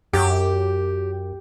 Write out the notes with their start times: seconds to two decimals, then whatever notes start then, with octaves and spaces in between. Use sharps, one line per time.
0.13 F#2 G4